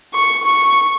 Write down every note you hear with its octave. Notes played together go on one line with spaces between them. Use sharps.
C#6
C#6